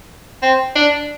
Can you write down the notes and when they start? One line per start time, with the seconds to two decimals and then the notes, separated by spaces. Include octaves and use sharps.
0.42 C4
0.75 D4